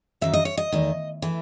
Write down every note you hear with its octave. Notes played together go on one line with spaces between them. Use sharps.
F#2 D#3 F#3 A3 E5
D#5
C#5
D#5
E2 D#3 A3
E3 A3